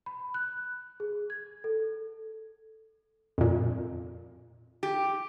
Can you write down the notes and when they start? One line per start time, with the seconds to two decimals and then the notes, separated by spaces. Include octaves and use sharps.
0.06 B5
0.34 F#6
1.00 G#4
1.30 G#6
1.64 A4
3.38 F2 A#2
4.83 G4